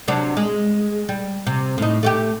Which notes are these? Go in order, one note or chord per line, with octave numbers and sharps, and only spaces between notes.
C3 F#3 D4
G#3
G3
C3
A2 D#4
A3 F#4 G4